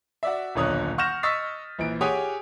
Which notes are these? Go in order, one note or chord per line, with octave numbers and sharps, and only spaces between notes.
F#4 D5 E5
D#1 B1 D3 C#5 D#6 F#6
F#5 C#6 F6 G6 A#6 E7
D#5 C#6 D#6 E6 A6 B6
A#1 E3 D7
G4 G#4 C#5 F#5 G#5 D#6